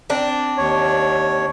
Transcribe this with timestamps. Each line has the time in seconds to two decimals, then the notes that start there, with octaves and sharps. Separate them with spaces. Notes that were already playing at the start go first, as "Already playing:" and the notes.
0.10 C4 D4
0.57 D#2 C#5